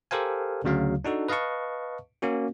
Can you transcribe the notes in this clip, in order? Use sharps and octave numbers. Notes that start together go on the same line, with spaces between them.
G4 A4 A#4 C5 F5 G#5
D2 C#3 F#3 F5
D4 D#4 F#4 A4
B4 D#5 F5 A5 C#6
A#3 C#4 F#4